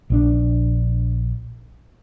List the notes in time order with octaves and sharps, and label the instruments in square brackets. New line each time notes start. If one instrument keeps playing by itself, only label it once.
[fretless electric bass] A#1 E3 D4